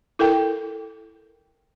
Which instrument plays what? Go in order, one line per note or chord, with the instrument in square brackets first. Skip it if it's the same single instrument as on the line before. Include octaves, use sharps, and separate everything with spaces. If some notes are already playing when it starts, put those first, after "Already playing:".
[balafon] E4 A4 A#4 G5